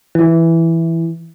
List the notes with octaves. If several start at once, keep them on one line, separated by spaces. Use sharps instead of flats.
E3